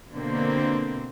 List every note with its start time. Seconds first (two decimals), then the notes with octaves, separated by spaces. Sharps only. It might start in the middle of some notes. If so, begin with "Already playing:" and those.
0.11 B2 D3 A#3 C4